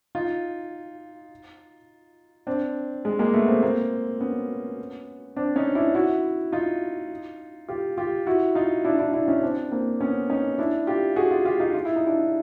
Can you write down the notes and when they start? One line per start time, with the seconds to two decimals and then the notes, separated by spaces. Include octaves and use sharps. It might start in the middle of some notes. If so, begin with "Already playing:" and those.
0.15 D#4 F4
2.47 C4 D4
3.05 G#3
3.19 G#3 A#3
3.33 A3 B3
3.48 A#3 C4
3.63 A#3 C4
4.21 B3 C#4
5.36 C4 D4
5.56 C#4 D#4
5.75 D4 E4
5.95 E4 F#4
6.52 D#4 F4
7.69 F4 G4
7.97 F4 G4
8.27 E4 F#4
8.55 D#4 F4
8.85 D4 E4
8.99 D4 E4
9.13 D4 E4
9.28 C#4 D#4
9.42 C4 D4
9.71 A#3 C4
10.00 B3 C#4
10.29 C#4 D#4
10.58 D4 E4
10.87 F4 G4
11.16 F#4 G#4
11.31 F4 G4
11.45 F4 G4
11.60 D#4 F4
11.74 F4
11.85 E4
11.96 D#4
12.07 D4 E4